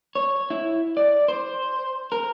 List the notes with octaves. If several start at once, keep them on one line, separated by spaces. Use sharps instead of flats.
C#5
E4
D5
C5
A#4